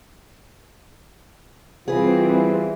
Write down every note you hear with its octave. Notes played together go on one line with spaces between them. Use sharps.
E3 G3 C4 F4 G#4 B4